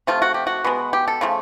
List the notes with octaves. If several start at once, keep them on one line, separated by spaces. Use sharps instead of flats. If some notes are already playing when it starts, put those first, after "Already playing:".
C3 F3 A3 F4
F#4
G4
F#4
B2 G#3 B3
G4
A4
C#3 F3 A3